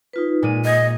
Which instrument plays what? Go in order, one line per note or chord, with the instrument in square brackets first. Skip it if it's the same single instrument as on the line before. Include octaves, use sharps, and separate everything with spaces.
[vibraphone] D#4 F4 B4
[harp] A#2 G#3 D#7 [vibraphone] A#3
[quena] D#5 [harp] D#6 G#6